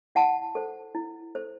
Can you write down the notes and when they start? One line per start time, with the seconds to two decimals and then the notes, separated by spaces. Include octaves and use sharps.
0.15 E4 F#5 A5
0.55 A4 C5
0.95 E4
1.35 A4 C5